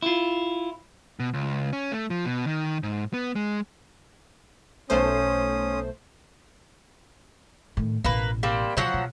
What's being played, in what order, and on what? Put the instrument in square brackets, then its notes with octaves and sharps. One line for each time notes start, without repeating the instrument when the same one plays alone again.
[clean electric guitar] E4 F4
[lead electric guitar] B2
C#2
C#4
A3
F3
B2
D#3
G#2
B3
G#3
[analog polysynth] B1 A3 C5 [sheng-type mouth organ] C#4 D#6
[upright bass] A2 D#3
[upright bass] A1 B2 [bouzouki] A#3 B4
[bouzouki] G3 A#3 C4
[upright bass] B2 [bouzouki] F3 F#3 F#5
[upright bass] B2